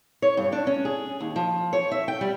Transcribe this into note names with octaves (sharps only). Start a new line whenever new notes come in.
C#5
G2
D4
C#4
G#4
D#2
F3
C#5
E5
G5
G3